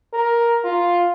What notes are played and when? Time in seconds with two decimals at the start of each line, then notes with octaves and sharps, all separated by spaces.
0.13 A#4
0.64 F4